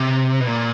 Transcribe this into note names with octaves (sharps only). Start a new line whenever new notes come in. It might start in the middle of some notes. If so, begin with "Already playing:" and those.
Already playing: C3
B2
A#2